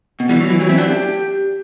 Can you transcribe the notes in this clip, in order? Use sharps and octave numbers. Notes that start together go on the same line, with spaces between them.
B2
E3 G3
F#3
E3
A2 E3 F#3
C4 E4
D4 F#4
G4